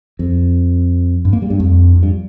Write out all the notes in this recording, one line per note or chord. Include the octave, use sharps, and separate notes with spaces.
F2
G2
A#3
G3
G2
F2
F2
G2